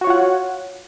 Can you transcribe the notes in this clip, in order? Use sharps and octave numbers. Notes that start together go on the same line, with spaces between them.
F4 F#4 C#5 F#5